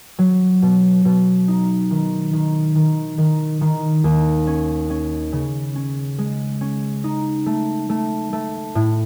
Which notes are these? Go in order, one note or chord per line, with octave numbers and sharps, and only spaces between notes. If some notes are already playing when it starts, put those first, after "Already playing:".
F#3
B2
B2
D#4
D#3
D#3
D#3
D#3
D#3
D#2
C#4
C#4
C#3
C#4
G#3
C#4
D#4
A3
A3
A3
A2